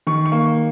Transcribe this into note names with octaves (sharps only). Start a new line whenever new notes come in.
D#3 C#6
C#6
A#3